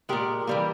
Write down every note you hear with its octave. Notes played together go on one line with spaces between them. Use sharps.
A#2 G#3 G4 A#4
E3 G3 A#3